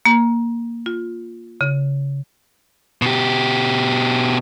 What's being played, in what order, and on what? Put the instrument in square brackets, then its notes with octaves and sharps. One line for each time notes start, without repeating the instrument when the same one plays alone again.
[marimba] A#3
F4
C#3
[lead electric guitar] B2 G4